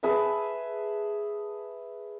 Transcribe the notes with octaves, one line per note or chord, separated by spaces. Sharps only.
G#4 B4 E5 A5